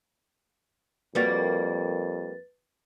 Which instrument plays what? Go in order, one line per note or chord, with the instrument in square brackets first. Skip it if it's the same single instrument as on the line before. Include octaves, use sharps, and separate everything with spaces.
[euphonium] F2 [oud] G3 A#3 F#4 [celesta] B4 A6